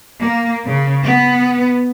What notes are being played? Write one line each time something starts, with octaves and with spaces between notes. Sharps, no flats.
A#3
C#3
B3